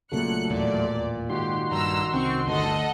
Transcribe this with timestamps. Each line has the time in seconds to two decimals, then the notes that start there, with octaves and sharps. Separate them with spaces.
0.12 A#1 A#2 C#3 F#3 A3 F#6 C#7
0.50 D#1 A1 E2 A#2 D5
1.30 G#2 D#3 F#4 G4 C6
1.71 A#1 G2 A#5 E6
2.13 C2 C4 C#4 C#6
2.47 G1 D2 A4 D#5 F#5